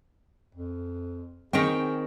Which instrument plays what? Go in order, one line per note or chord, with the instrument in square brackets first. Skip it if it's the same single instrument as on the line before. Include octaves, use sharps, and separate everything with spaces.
[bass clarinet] F2
[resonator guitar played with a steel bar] D#3 C#5 G5 [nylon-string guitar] C4 [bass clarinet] G#4